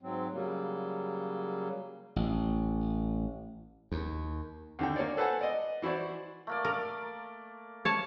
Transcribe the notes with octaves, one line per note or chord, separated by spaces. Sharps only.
G#2 F#3 C4
C#3 F#3 G3 A#3
A1
D#2
D#2 D3 G5
A#3 C#5 D5
A4 B4 C5 F#5 G#5
D5 D#5
E3 E4 F#4 C5 D5
A3 A#3 D5
A#4 D5
C#5 A5